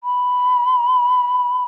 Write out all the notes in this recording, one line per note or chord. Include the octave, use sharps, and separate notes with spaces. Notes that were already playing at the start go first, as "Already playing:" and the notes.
B5